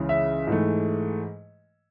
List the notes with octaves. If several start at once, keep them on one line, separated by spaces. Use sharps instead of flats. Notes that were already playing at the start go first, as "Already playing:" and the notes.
Already playing: C#2 C#3 E3
E5
G#2 E3 A3